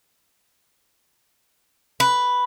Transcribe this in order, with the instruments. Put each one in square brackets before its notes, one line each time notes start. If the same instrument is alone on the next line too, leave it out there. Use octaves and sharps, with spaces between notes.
[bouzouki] B4